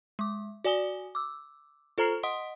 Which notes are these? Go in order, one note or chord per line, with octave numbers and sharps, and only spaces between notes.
G#3 D6
F#4 D5 G#5 D#6 G7
D6 E6
F4 A4 C5 A#5 F6 C7
D#5 F#5 C6 D#6